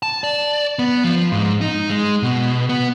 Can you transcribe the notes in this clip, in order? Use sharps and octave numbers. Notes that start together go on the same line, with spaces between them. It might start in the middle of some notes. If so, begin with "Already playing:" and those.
A5
D5
B3
F3
G#2
D#4
G#3
B2
B3